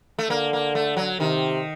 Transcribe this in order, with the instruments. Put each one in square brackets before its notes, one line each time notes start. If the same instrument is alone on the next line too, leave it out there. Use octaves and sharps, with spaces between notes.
[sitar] A3
[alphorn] D3 [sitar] A#3
[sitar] A#3
A3
F#3
[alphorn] C3 [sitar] D#3